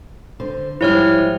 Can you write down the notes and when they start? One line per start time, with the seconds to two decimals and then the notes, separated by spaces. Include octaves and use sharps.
0.40 D3 C5
0.81 G#2 F3 G3 E4 C#5 F6